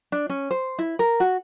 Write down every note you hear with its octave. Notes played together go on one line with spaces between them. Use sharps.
D4
C#4
C5
E4
A#4
F#4